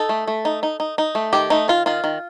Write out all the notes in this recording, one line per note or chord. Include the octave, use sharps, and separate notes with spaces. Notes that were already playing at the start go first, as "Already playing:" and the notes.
Already playing: D#4 A4
A3
A3
D#4
D#4
D#4
D#4
A3
D#3 G4
A3 D#4
D#3 F4
D#3 F4
D#3